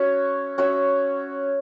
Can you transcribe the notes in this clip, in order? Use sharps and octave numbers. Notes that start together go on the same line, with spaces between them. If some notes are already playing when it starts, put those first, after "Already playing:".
Already playing: C#4 F#4 C#5 E5
C#4 F#4 C#5 E5